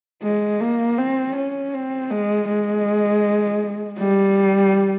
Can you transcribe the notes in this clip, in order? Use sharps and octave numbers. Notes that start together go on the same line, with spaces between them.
G#3
A#3
C4
C#4
C4
G#3
G#3
G3